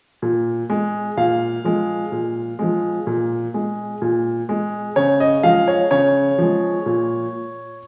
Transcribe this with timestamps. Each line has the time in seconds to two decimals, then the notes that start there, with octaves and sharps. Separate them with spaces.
0.22 A#2
0.70 G#3
1.17 A#2 F5
1.64 F3 G#3
2.12 A#2
2.59 F3 G#3
3.07 A#2
3.54 G#3
4.02 A#2
4.49 G#3
4.96 C#3 C#5
5.20 D#5
5.43 F3 G#3 F5
5.68 C#5
5.91 C#3 C#5
6.38 F3 G#3
6.86 A#2